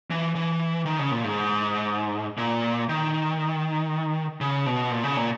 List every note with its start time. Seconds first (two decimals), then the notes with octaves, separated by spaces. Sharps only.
0.11 E3
0.35 E3
0.86 D#3
0.99 C#3
1.11 A#2
1.24 G#2
2.38 A#2
2.89 D#3
4.41 C#3
4.66 B2
4.91 A#2
5.04 C#3
5.17 A#2